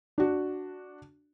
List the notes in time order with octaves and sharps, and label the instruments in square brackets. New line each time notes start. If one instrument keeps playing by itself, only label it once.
[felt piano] D4 F#4